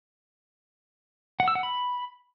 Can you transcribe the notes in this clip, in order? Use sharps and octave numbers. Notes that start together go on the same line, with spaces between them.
F#5
E6
F#5
B5